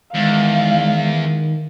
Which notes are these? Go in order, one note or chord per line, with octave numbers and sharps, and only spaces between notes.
E2 D#3 G#3 F5